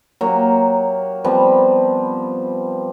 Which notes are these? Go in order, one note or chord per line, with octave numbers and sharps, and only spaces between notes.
F#3 A#3 G4
F3 G3 B3 C4